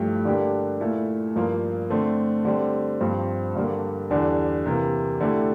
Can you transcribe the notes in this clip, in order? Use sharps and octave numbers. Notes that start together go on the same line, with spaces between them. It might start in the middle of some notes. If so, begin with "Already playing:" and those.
Already playing: G2 F3 A3 E4 G4
D3 G3 A#3 D4 G4
A#2 A3 E4
G2 F3 A#3 F4
D3 A3 C4
D3 G3 C4
G2 F3 C4 G4
G2 D3 G3 A#3
E2 D3 G3 D4 G4
C3 E3 A#3
D3 A3 E4 G4